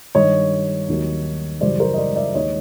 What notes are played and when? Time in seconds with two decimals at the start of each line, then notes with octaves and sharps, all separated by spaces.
0.15 G2 D#3 G3 C#5 D#5
0.89 D#2 D#3 F#3
1.61 F#2 C#3 E3 G3 C5 D5
1.80 A#4 C5
1.94 D#5
1.98 C5 D5
2.16 D5 E5
2.34 D#2 D#3 G#3 C#5 D#5